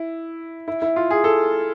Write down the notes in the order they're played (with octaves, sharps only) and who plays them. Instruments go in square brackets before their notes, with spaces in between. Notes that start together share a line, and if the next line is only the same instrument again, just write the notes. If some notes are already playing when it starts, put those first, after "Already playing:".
Already playing: [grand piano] E4
E4
E4
F4
G#4
A4